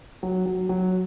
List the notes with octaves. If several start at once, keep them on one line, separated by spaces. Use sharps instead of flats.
F#3
F#3
F#3